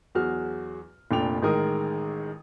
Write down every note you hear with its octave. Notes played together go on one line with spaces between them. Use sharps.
E2 F#3 F#4 G#4 F6
F1 A#2 D4 G5 F7
A1 D#3 G#3 A#4 D#6